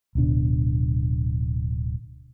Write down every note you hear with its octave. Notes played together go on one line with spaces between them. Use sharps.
D1 B2 D4